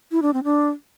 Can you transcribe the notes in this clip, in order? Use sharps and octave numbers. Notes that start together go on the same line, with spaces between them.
E4
D4
C4
D4